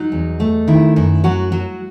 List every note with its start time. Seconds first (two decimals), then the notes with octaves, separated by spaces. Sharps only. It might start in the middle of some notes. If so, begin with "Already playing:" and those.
Already playing: F#3 D#4
0.12 E2
0.40 A3
0.68 D#3 E4
0.96 F#2 E4
1.24 F#3 F#4
1.52 F#3